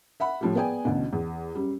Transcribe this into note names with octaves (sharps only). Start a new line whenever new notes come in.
E5 F#5 B5
A2 F3 G3
B3 G#4 D5 G5 G#5
A1 D2 B2
E2
F#2 G3